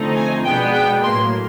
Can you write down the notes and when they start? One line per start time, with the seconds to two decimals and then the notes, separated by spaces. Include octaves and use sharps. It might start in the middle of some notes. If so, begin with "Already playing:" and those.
Already playing: D3 F3 A3 C4 D#4
0.16 G#5
0.45 B2 G#3 B3 D4 G5
0.74 G5
1.03 A2 F#3 A#3 C6